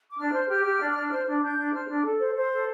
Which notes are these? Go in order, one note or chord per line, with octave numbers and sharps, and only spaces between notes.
D6
D4 F6
C5
G4 F6
G4
D4
D4
C5
D4
D4 G6
D4
C5 F6
D4
A4
C5
C5
A4